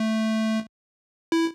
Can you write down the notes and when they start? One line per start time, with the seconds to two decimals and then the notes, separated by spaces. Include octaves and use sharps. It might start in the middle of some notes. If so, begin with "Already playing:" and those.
Already playing: A3
1.32 E4